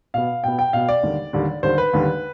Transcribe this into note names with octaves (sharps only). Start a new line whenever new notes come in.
B2 B3 F5
B2 B3 G5
G5
B2 B3 F5
D5
D#2 D3 G3
D#2 D3 G3
D#2 D3 G3 C5
B4
D#2 D3 G3